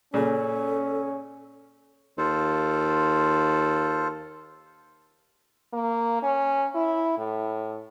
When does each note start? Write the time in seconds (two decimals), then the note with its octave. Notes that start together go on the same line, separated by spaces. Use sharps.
0.14 A#2 C#3 C#4 A4
2.18 D#2 F4 A4 C5
5.73 A#3
6.23 C#4
6.75 E4
7.18 A2